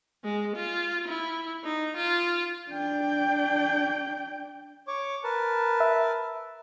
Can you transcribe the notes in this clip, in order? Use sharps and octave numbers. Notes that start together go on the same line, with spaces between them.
G#3
F4
E4
D#4
F4
D4 G5
C#5 C#6 D6
A#4 B4 A5
E5